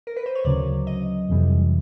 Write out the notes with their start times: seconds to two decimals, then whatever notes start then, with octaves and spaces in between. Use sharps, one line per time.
0.07 A#4
0.16 B4
0.26 C5
0.35 C#5
0.45 D2 C#3 F#3 D5
0.87 D#5
1.29 F2 C3 E3 G3